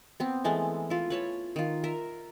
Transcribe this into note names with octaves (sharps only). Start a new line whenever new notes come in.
B3 C4
E3 G#3 A3
E4 F4
B4 C#5 A5
D#3 F4
A#4 E5